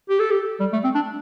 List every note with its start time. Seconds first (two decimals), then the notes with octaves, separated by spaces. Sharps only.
0.10 G4
0.20 A4
0.31 G4
0.60 G3
0.73 A3
0.84 C4
0.95 D4